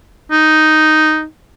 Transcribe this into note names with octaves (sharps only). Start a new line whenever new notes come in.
D#4